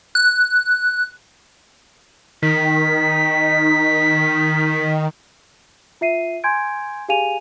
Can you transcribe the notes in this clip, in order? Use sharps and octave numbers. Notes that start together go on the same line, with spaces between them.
F#6
D#3 B6
F4 E5 C7 D#7
G#5 C6 G6 G#6 D7
G4 G#4 F5 G#5 D#7 F7